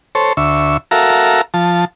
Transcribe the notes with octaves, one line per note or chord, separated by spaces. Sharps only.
A4 C5 C#5
D2 E5 C#6
F#4 A4 A#4 E5 F5 A#5
F3 A5